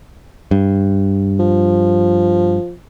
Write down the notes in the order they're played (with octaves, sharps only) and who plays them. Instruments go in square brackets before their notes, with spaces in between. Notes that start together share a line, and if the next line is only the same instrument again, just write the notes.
[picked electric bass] G2
[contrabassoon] F3